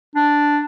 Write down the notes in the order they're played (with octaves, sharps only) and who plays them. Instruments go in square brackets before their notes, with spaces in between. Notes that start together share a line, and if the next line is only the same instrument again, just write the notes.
[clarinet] D4